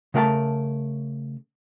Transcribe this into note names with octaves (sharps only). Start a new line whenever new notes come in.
C#3 A3 A#4 F#5 A5